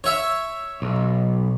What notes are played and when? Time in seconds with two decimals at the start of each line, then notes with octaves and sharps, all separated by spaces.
0.04 C#5 E5
0.82 B1